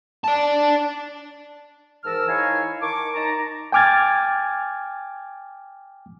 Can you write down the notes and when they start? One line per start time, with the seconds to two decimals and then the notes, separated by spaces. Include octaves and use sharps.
0.24 D5 A5
2.04 G#2 E3 A#4 A5 E6 F6
2.28 D#4 E4 C#5 F5 G#5
2.82 D#3 A5 C#6 D6
3.16 D#4 A5 A#5
3.72 G5 G#5 D6 F6 G#6 A6